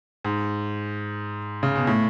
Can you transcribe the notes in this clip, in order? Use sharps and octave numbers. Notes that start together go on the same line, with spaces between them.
G#2
C#3
B2
A2